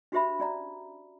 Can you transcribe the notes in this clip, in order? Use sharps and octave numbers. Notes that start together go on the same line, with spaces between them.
D4 F#4 G4 C5 E5 B5
C#4 D5 A#5